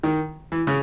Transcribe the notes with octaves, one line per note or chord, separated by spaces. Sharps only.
D#3
E3
C#3